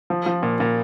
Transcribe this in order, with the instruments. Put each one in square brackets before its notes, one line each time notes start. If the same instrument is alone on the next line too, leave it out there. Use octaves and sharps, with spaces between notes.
[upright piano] F3
F3
A#2
A#2